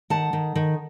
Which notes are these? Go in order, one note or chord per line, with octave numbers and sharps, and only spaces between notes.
D#3 F#5 A5
D#3
D#3